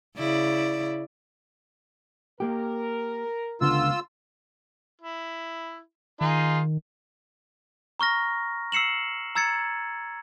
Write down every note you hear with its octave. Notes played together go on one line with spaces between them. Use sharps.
C#3 E4 D5
A#3 G4 A#4
C#2 D3 B3 F4 E6
E4
D#3 D#4 F4 G#4
A#5 C#6 F6 A#6
E6 C7 C#7 E7 F#7
A#5 E6 G#6 A6 C#7